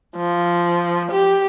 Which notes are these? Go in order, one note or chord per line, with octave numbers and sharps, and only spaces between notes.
F3
G4